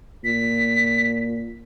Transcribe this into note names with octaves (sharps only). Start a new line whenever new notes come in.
A#2 B6